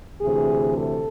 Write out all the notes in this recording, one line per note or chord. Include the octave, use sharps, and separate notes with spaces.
D2 C3 E3 G#4
A4